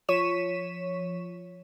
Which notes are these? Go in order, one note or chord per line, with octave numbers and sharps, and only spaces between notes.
F3 C#5 C#6 B6 D#7 E7